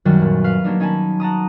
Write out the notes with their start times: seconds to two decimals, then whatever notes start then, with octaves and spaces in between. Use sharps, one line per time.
0.05 F#2 D#3 F#3 G3 F#4 A6
0.20 A#2 B3
0.44 B4 F5
0.64 F#3 A#3 D4 D#4
0.80 C#4 D#4 G#5 A5 B5
1.20 F#5 A5 A#5 D#6